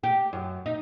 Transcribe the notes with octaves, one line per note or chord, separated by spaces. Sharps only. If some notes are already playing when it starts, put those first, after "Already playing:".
G4
F#2
D#4